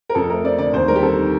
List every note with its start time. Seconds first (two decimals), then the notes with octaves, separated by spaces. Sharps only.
0.09 A#4
0.15 F2 A4
0.29 A3 A#4
0.44 C4 D5
0.58 D3 D5
0.73 D#2 C5
0.88 G3 A#4
0.96 G4
1.03 C4 A4
1.17 D#3